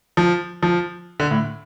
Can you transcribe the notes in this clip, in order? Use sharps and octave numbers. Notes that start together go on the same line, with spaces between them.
F3
F3
D3
A2